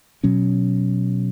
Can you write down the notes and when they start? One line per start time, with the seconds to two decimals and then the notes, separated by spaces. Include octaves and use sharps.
0.24 B2 F#3 C#4